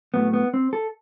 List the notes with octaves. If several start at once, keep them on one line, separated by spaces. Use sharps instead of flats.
A2 F#3 A3 B3
B3
C4
A4